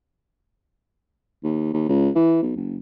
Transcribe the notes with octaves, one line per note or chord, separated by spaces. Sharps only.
D#2
D#2
C#2
E3
B1
F#1